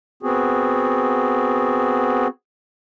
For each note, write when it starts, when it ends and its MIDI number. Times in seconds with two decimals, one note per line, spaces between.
0.23 2.27 59
0.23 2.27 60
0.23 2.27 66
0.23 2.27 68